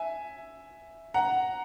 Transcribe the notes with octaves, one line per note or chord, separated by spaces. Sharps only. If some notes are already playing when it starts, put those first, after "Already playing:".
Already playing: E5 G#5
F#5 A#5